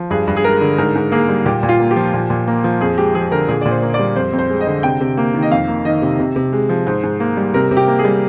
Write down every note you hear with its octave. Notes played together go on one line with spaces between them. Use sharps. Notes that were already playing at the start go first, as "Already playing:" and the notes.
Already playing: F3
G2 G#4
G2
G#4
G#3 A#4
D3
G#2 A#4
G#2
A#3 G#4
G3
A#2 G4
A#2
F4
A#3
G4
F3
A#2
A#2
A#3
F3
F2 G#4
G#3 G4
F3 G#4
D3 A#4
A#2 G#4
A#2 D5
C5
A#3
D5
G3
F2 C5
F2
C5
G#3
D#5
D3
C3 G5
C3
A#3
D#3
D#5
F2 F5
A#3
D#3 D#5
C3
C3
C3
G#3
F3
G#2 C5
G#2
A#3
G3
C3 A#4
C3
G4
A#3
G#4
G3